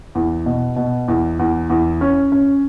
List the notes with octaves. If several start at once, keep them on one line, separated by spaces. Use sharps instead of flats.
E2
B2
B2
E2
E2
E2
C#4
C#4